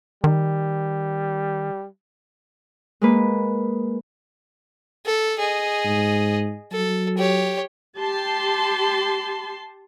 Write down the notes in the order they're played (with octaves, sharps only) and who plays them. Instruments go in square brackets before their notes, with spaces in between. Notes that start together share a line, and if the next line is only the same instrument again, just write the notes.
[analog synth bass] D#3 [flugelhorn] G3
[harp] G#3 A#3 B4
[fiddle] A4
G#4 D#5
[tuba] G#2
[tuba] F#3 [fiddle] A4
[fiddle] G4 C#5
[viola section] G4 A5 C6